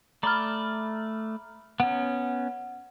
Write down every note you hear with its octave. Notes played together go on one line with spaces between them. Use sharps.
A3 D5 A#5 B5 F6
B3 C#4 F#5